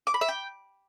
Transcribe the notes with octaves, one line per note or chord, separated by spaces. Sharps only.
D6
B5
E5
G5